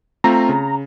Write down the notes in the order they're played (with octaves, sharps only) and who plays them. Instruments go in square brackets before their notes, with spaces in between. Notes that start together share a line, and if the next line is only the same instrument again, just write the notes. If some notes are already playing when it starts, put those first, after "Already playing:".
[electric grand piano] A3 C4 F4 [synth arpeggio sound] A#5
[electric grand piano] C#3